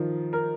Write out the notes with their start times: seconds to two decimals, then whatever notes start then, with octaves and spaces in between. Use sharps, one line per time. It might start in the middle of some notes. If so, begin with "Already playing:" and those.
Already playing: D#3 F3
0.33 A#4